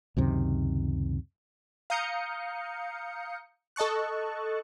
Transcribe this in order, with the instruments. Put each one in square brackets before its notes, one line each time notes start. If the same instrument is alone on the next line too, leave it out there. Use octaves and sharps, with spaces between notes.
[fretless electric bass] C#2 F#2 C3 D#3
[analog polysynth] F5 A#5 D#6 G6 C#7
A4 D#5 A5 C#6 F#6